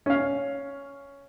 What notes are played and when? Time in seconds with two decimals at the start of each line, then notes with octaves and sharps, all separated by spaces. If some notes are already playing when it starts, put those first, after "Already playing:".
0.06 C#4 F5